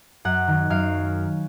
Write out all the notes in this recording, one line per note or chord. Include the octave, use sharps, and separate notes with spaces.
F#2 F#5
D#3
F#2 F5